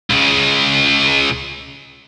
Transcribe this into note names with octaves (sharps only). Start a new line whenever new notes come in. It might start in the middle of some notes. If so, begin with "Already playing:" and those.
C#2 C#3